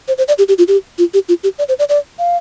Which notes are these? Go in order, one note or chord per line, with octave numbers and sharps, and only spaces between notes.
C5
C5
D5
G4
G4
F4
G4
F4
G4
F4
G4
D5
C5
D5
D5
F5